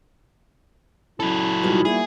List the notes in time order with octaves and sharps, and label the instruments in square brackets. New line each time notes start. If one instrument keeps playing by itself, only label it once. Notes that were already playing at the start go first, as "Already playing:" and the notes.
[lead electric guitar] F#3 A4 [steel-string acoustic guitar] C#4 [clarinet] E4
[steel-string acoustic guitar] B2 G3 G#3 [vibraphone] D#4 F4 F#4
[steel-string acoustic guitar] G3 A#3 F#4 [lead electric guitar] G#4 [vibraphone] E5